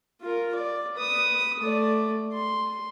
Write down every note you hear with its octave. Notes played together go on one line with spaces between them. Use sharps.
F4 A#4
D5
B4 D#6
A3 D5
C6